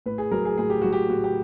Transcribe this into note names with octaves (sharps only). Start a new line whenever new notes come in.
A2 B4
G#4
F#3 A#4
G#4
A2 G#4
G4
F#3 F#4
G4
A2 F#4
G4